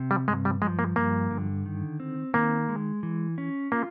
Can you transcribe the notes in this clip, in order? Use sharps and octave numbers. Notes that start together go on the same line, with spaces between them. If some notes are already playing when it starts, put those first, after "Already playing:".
Already playing: C3
G3
G2 G#3
G3
F3 G#3
A#3
G2 A#3
D3
D#3
C4
D#3 A#3
G#3
E3
C#4
A#3 F4